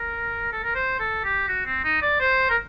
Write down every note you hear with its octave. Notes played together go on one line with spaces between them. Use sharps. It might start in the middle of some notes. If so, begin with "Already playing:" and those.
Already playing: A#4
A4
A#4
C5
A4
G4
F#4
C4
D#4
D5
C5
A#4